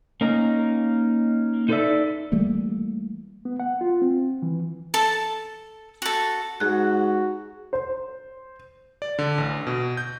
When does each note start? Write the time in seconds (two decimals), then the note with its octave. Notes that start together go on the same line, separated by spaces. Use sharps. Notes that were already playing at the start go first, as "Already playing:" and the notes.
0.21 A#3 C#4 D#4
1.69 D#4 A4 B4 C5 D5 E5
2.32 E3 G3 A3 A#3
3.45 B3
3.60 F#5
3.81 F4
4.02 C4
4.42 E3
4.94 A4 A5
6.02 F#4 A4
6.60 G#2 F#4 G#4 F#6
7.73 C5
9.02 D5
9.19 D3
9.38 A1
9.67 B2
9.97 G6